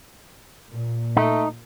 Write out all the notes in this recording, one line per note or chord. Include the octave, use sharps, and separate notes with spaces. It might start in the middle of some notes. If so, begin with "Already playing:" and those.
A#2
A3 D#4